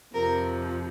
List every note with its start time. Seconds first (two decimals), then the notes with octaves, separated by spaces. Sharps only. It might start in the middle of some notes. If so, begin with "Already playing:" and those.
0.13 F2 C3 F3 A#4